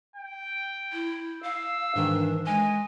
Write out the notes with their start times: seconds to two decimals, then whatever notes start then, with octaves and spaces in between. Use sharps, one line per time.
0.16 G5
0.93 E4
1.43 F5 E6
1.95 G#2 D#3 E3 D4
2.47 G#3 D#5 G#5